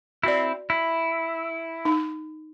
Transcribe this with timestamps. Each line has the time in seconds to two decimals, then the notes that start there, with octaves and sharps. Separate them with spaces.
0.24 C4 E4 F#4 D5
0.70 E4
1.85 D#4